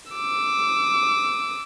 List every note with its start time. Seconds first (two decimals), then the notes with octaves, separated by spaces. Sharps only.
0.12 D6 E6